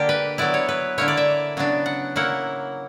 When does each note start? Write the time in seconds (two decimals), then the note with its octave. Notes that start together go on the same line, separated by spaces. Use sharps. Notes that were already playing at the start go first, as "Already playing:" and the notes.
Already playing: D3 A#3 D4 G4
0.09 B4
0.38 F#3 B3 E4 D5
0.54 C#5
0.69 B4
0.98 D3 A#3 E4 C#5
1.08 D5
1.17 E5
1.57 C#3 F#3 B3 D4
1.86 F#5
2.16 F#3 A#3 E4 F#5